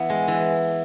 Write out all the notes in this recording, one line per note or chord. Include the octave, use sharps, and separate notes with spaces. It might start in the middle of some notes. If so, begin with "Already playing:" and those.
Already playing: E3 B3
G#3
E3